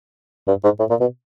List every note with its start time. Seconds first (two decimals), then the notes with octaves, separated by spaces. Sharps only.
0.48 G2
0.64 G#2
0.79 A2
0.90 A#2
1.00 B2